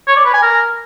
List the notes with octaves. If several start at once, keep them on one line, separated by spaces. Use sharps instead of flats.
C#5
D5
B4
G#5
A#4